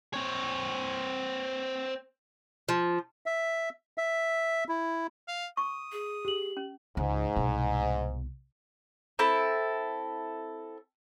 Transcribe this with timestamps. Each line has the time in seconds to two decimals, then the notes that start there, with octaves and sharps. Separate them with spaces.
0.14 C4 C#5
2.69 F3
3.26 E5
3.98 E5
4.69 E4
5.28 F5
5.57 C#6 D#6
5.92 G#4
6.25 G4 F#7
6.57 C#4
6.97 C#2 G#2
7.36 C2 B2
9.19 C4 E4 A4